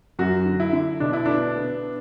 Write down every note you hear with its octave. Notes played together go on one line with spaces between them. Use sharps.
F#2 F#4
D3
E4
D3
B2 D4
E4
B3 D4
B3